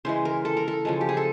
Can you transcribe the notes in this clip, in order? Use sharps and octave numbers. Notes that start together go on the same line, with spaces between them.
C#3 E3 G#3 C5
A#4
A4
A#4
A4
C#3 F3 G#3
G4
G#4
A4